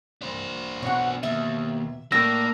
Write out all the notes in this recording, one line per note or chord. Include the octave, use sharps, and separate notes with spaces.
D4 C5
B2 C#5 F#5
D#2 E5
A2 A#3 D4 D5 E6 A#6